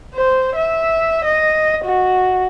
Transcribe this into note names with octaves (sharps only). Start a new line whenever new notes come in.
C5
E5
D#5
F#4